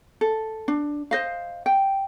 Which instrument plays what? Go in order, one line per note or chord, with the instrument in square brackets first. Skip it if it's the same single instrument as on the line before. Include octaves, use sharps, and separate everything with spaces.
[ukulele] A4
D4
C5 D#5 F5
G5